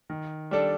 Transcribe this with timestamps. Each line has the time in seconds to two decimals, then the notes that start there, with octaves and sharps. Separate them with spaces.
0.10 D#3
0.51 G3 D4 A4